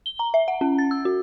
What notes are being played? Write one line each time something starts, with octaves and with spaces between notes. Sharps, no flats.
G7
A#5
E5
F#5
C#4
A6
E6
F#4